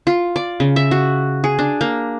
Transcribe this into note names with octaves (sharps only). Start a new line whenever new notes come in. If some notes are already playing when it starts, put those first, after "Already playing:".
F4
D5
C#3
E5
F#4
G#4
D4
A#3